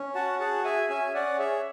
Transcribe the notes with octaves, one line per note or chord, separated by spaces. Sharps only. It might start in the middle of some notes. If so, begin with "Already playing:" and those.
Already playing: C#4
F#4 F#5 A5
G#4 F#5 A5
G#4 E5 G#5
C#4 E5 G#5
C#4 D5 F#5
G#4 C#5 E5